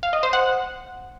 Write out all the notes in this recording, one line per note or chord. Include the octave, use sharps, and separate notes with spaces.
F5
D#5
C5
F#5